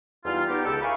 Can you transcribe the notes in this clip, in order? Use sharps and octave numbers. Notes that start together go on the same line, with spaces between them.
E2 G3 D#4 F4
B3 D#4 G4
C#2 G4 A4
A#4 E5 F5 G#5 B5 C#6